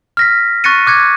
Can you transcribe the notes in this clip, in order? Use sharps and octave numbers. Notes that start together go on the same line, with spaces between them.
F6 A#6 B6
C#6 F#6 A6 A#6 C#7 D#7
D6 F#6 G#6 C#7